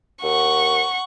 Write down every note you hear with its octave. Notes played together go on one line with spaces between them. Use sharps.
D#2 F#5 C#6